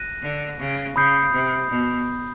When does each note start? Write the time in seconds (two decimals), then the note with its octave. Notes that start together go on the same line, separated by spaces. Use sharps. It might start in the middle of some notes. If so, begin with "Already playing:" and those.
Already playing: F#6 A#6 D#7
0.23 D3
0.60 C#3
0.96 C#3 B5 D#6 G6 C7
1.33 C3
1.70 B2